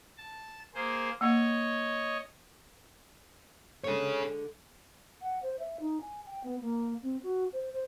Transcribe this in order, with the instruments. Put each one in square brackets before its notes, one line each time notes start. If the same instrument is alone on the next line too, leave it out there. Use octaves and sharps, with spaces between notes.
[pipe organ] A5
A#3 G#4 C5
[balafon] A#3 F#5 [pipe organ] C#5 D#5
[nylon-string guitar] D3 G#3 [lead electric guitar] G#4 C#5
[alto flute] F#5
C5
E5
D#4
G#5
G5
B3
A#3
C4
F#4
C5
C5